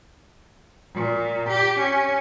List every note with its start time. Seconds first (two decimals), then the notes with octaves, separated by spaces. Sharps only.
0.93 A#2
1.48 G4
1.80 C#4